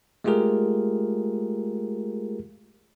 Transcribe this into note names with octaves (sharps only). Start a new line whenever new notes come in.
G#3 A3 F4 G4 G#4 A#4